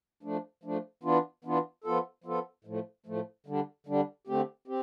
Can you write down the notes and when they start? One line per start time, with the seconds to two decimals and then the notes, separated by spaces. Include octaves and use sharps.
0.23 F3 A3 D4
0.63 F3 A3 D4
1.03 E3 B3 D4 F4
1.44 E3 B3 D4 F4
1.84 F3 B3 F4 A4
2.24 F3 B3 F4 A4
2.64 A2 F3 A3
3.06 A2 F3 A3
3.46 D3 G3 D4
3.86 D3 G3 D4
4.27 D3 A3 C4 G4
4.67 C4 G4